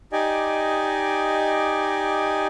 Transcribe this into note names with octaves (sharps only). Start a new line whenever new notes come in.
D#4 G4 D5 D#5 G#5